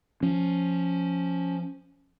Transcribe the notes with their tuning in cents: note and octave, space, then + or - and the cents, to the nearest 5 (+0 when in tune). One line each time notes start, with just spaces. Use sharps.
F3 +5 C#4 +0